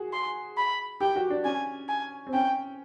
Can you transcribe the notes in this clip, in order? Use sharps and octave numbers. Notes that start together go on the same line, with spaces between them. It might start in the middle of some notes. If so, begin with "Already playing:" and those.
Already playing: F#4 G#4
C6
B5
G4 G5
F#4
D4
C#4 G#5
G#5
C4
C#4 G5